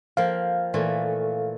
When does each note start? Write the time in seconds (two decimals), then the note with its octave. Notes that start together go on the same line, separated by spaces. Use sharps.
0.17 F3 A#3 F5 G5
0.74 A#2 E3 A3